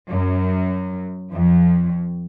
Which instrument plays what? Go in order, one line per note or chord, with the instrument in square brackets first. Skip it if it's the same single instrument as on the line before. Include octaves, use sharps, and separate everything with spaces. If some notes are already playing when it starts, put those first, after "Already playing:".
[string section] F#2
F2